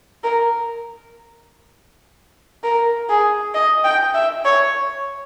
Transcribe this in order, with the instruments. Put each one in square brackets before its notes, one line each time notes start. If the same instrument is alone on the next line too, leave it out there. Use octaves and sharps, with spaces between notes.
[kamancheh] A#4
A#4
G#4
D#5
G5
E5
C#5